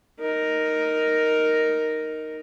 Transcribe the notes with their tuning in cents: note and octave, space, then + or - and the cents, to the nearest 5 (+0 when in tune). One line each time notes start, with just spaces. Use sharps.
D#4 +0 A#4 +0